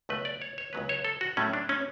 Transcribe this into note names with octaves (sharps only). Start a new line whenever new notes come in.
C#2 B2 F#3 A3 B4
D5
C#5
C#5
C#2 C#3 F#3 B3 B4
C#5
A4
F#4
A2 F#3 A3 C#4
D4
C#4